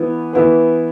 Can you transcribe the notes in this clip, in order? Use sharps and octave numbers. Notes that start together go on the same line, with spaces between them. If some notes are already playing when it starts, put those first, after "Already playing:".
Already playing: E3 B3 E4
E3 B3 E4 B4